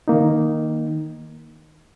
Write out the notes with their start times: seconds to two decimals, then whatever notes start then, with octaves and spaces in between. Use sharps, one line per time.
0.08 D#3 A#3 D#4